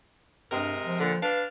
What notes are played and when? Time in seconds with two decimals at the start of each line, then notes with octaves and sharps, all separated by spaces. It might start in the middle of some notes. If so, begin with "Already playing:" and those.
0.52 G2 C3 G#3 A#4
0.84 F3
1.00 A#2 D3
1.23 D4 B4 F5